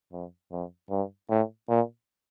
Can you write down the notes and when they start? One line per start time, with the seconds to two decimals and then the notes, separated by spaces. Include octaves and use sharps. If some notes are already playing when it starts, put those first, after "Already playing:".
0.12 F2
0.52 F2
0.90 G2
1.30 A2
1.69 A#2